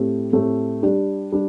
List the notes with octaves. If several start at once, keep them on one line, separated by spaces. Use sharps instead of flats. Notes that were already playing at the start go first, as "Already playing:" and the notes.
Already playing: A2 A3 C4 G4
A2 A3 C4 G4
G3 D4 G4
G3 D4